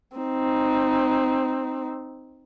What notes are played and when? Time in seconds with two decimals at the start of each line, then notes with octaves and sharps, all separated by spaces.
0.17 C4 D#4